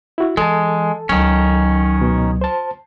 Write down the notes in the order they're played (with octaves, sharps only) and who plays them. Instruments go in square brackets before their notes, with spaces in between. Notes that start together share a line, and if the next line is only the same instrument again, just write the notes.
[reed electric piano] E4 F#4
[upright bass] E3 [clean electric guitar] G#3 [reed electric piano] A4 A5
[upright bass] C#2 F#3 [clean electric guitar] D#3 C#4
[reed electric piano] B2
C5 A5